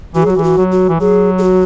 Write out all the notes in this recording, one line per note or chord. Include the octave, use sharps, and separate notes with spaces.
E3 F#4
G#4
F#3 F#4
E3 G#4
F#4
F#3
F#4
E3
F#3 G#4
G#4
F#4